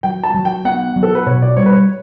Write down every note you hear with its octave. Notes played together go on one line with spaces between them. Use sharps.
F#3 G5
A5
F#3
G5
B3 F#5
F#3
A4
B4
B2 C#5
D5
G3 C#5
B4
C#5